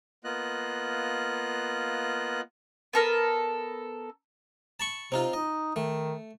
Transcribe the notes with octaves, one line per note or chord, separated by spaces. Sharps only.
A#3 B3 F4 D#5 F#6
B3 A4 A#4
A5 B5 C#6
C3 C4 D#4 F4
D#4 D#5
D#3 A3